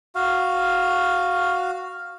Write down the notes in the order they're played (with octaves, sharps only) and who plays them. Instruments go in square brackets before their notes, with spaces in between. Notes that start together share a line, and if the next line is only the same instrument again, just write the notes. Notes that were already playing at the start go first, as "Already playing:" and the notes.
[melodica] F#4 F5